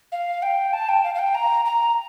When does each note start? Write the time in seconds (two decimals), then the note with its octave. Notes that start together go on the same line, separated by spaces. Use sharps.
0.12 F5
0.43 G5
0.73 A5
0.89 G5
1.04 F5
1.15 F5
1.19 G5
1.35 A#5
1.65 A#5